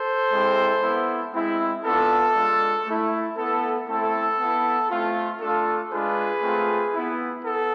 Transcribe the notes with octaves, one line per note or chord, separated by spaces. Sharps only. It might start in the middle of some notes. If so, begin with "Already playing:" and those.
Already playing: A4 C5
G#3 C4 E4
B3 E4
G#3 C4 E4
B3 D4 F4 A4
G#3 D4 F4
A3 E4
B3 E4 A4
A3 C4 E4 A4
B3 E4
A3 C4 F4
A3 D4 F4 A4
G#3 D4 F4 G#4 B4
A3 C4 F4
B3 E4
B3 A4